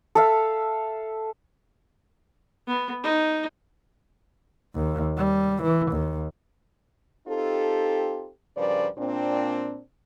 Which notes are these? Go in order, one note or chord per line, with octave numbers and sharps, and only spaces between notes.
A4 E5 F5
B3
D#4
D#2
G3
E3
D#2
C4 D#4 F4 G4 A4
G2 C#3 F3 A#4 B4 D5
A#2 C4 D4